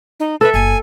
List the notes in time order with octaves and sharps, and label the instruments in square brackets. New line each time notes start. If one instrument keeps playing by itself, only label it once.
[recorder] D#4
[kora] A4 E5 [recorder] B4
[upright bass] F#1 [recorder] G#5